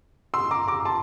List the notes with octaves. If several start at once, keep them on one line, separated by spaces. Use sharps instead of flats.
C6 E6
A#5 D6
A#5 D6
D6
A5 C6